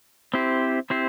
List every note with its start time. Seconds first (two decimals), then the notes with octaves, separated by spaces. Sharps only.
0.34 C4 E4 G4 C5
0.90 C4 E4 G4 C5